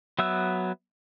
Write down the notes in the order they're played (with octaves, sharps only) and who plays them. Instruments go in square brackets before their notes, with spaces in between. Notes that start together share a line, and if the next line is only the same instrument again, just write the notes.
[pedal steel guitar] F#3 B3 E5 E6 F#6